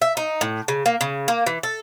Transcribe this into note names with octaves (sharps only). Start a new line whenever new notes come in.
E5
D#4
A2
C#3
A#3
C#3
A#3
E3
A4